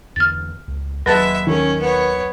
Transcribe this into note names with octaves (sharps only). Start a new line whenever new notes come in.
E2 D3 B3 F6 A6
C#2
D#2 F#3 G#3 B4 E5 A5 F#6 A6
D#3 C#4
B3 C#5